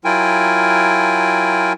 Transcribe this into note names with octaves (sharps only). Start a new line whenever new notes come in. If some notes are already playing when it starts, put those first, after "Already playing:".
F#3 E4 F4 A#4 G5 G#5